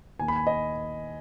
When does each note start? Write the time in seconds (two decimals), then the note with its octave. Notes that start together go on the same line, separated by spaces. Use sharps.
0.19 D#2 G#5
0.28 B5
0.36 G#5
0.47 D#5